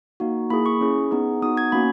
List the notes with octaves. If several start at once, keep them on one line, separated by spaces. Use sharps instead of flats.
A#3 D#4 F#4
A#3 E4 G#4 B5
C#6
C#4 E4 G#4
B3 D#4 G#4
B3 D#4 F#4 D#6
G#6
A#3 C#4 F#4 B5